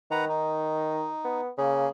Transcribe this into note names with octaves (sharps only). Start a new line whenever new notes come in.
D#3 B4 F#5 A#5
D#4
B3
C#3 A#3 G#4